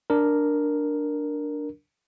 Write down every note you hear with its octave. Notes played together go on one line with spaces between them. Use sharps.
D4 A#4